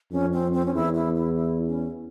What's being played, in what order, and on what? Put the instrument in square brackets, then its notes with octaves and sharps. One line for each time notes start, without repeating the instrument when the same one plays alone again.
[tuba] F2 [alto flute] C#4
[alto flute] C4
C4
C#4
[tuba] E2 [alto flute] E4
[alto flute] E4
E4
E4
C#4